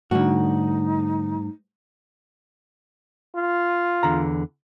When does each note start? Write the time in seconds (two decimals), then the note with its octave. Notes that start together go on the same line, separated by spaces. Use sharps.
0.11 G#2 D3 G3 A3 D#4 F#4
3.36 F4
4.03 E2 D3 A#5